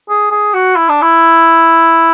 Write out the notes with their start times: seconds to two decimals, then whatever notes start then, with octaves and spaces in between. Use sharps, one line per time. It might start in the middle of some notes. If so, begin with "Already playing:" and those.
0.09 G#4
0.31 G#4
0.54 F#4
0.76 E4
0.89 D4
1.02 E4